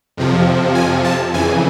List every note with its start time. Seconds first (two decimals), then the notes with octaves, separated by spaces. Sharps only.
0.17 F2 C3 F3
0.75 G#5
1.04 A5
1.33 F2 C#3 E3 G#5